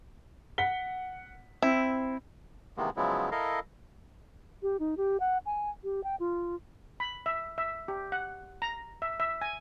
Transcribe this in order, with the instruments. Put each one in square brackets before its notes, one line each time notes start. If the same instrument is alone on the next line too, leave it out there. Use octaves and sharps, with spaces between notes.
[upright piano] F#5 B6 G7
[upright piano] C4 [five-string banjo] E4
[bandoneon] C3 D#3 E3 G#3 A#3 B3
C#3 F3 F#3 G#3 B3 E4
E4 A4 A#4 D#5 F5
[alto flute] G4
D#4
G4
F#5
G#5
G4
G5
F4
[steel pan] B5
E5
E5
G4
F#5
A#5
E5
E5
G#5